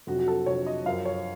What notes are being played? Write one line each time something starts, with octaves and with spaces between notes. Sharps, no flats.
F2 C3 F#3 F#4
F#4
A4
F2 C3 F#3 C#5
D#5
F#2 F3 F5
C#5